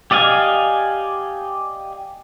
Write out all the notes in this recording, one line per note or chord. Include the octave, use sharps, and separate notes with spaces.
G4 D5 D#5 F5 G#5